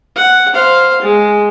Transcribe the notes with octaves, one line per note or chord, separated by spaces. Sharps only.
F#5
C5 F5
G#3